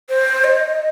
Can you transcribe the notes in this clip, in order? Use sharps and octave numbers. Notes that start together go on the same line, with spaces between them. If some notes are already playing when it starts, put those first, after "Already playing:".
C5
D#5